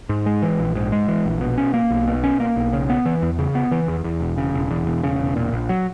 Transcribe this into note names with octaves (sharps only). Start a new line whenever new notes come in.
G#2
G#3
E3
A#1
G#2
G#3
E3
A#1
B2
C#4
A#3
B1
B2
C#4
A#3
B1
C#3
B3
E3
E2
C#3
B3
E3
E2
E2
E1
C#3
E1
E2
E1
C#3
E1
A#2
A#1
F#3